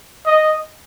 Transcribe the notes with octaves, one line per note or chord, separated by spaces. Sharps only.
D#5